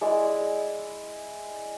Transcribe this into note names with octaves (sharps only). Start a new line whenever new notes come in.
G#3 E4 D5